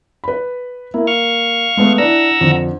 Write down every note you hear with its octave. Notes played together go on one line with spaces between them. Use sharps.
B4 B5
A#3 E4
F5 C#6 F6
G#3 A3 B3
D4 E4 F#5 A#5 E6
F2 D3